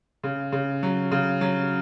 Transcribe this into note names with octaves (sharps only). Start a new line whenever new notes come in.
C#3
C#3
F#3
C#3
F#3